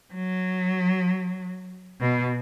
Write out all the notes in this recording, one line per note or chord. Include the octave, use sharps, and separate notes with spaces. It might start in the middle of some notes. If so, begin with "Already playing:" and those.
F#3
B2